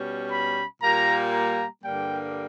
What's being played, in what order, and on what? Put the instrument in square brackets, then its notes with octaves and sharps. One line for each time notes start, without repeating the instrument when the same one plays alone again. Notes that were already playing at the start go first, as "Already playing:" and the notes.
Already playing: [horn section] B2 G3 C#4
B5
A#2 G3 A#3 A#5
A#5
G2 D3 G3 A#3 G5